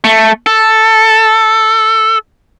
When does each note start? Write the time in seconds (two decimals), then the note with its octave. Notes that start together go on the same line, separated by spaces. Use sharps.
0.04 A3
0.46 A4